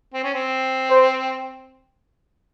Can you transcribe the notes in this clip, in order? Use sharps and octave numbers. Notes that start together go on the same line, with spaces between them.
C4
C#4
C4
C5